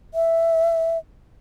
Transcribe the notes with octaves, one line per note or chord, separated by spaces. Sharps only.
E5